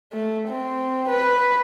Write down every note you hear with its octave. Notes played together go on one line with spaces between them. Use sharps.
A3
C4
B4